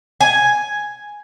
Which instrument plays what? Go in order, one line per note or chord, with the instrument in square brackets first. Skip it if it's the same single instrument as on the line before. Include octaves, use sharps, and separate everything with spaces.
[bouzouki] G#5